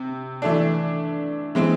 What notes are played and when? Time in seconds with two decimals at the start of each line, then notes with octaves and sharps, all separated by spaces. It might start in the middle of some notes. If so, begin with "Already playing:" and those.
Already playing: C3
0.42 E3 A3 D4
1.55 E3 G#3 C4